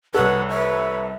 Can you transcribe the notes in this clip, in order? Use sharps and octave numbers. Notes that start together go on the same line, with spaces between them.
C2 A4 B4 C#5 F#5
B4 C#5 E5